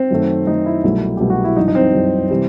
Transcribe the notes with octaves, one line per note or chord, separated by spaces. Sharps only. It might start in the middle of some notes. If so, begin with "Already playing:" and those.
Already playing: C4
F#2 D#3 A3
F#2 D#3 A3 D#4
E4
C2 B2 F#3 A3
C2 B2 F#3 A3 G4
F#4
E4
F#2 E3 G3 D#4
D#4
C4
F#2 E3 G3
C3 E3 G3